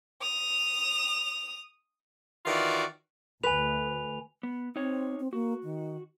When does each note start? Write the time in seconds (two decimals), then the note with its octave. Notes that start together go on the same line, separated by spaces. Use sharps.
0.22 D#6 F7
2.45 D#3 E3 F4 F#4 D5
3.43 D2 B4 G#5 F7
4.43 B3
4.76 C4 D#4 C#5
5.20 C4
5.33 A#3 F#4
5.64 D#3